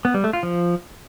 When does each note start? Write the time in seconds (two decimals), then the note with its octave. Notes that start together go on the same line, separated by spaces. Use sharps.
0.05 B3
0.14 G3
0.24 A3
0.33 F4
0.43 F3